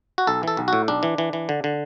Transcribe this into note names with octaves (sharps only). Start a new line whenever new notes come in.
F#4
B1 A4
E3 A4
B1
A2 F#4
B1 D4
E3
E3
E3
D3
D3